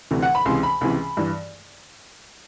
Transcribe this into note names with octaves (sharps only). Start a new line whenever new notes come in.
D2 C3 E3
F#5
B5
C#2 C3 E3 C6
B5
C#2 C3 E3
G2 E3